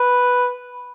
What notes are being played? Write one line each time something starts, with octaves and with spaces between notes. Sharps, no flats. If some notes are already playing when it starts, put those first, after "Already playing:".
Already playing: B4